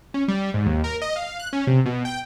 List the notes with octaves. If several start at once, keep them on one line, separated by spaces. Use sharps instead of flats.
C#4
G3
G#2
D#2
A#4
D#5
F5
F#6
C#4
C3
B2
G5